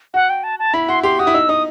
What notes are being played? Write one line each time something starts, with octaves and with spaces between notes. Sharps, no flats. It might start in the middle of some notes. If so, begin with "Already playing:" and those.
F#4 F#5
G5
A5
A5
E4 B5
F#4 C6
G4 C6
F#4 D#6
E4
D#4 E6
D#4 D#6